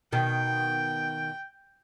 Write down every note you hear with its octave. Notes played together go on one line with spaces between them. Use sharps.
B2 D#3 G5